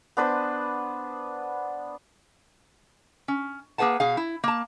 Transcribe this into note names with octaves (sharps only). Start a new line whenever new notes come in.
B3 D4 B4 C5
C#4
A#3 G#4 B4 F#5 A5
B2 G#4 F5
E4
A#3 A5